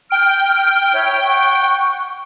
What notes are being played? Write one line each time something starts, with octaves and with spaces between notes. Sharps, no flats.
G5 F6 D7
E4 C#5
F#5 C#6